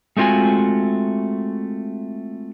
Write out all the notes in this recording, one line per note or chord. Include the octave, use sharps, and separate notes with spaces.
G#3 A3 C4 F4 F#4 G#5